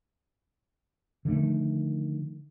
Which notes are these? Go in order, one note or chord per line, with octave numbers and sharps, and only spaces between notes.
D3 D#3 F3 A3